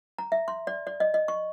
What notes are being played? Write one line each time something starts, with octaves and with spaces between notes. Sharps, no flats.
A#5
E5
C6
D5
D5
D#5
D#5
C#6